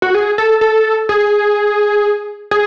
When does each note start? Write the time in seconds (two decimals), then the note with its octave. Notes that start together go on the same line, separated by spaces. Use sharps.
0.02 F#4
0.14 G#4
0.38 A4
0.61 A4
1.09 G#4
2.51 G#4